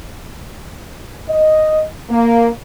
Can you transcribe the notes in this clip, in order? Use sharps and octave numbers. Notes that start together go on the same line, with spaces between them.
D#5
A#3